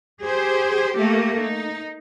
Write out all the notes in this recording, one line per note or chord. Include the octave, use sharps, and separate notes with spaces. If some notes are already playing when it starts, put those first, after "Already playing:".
G4 G#4 C5
A3 A#3 G4
D#4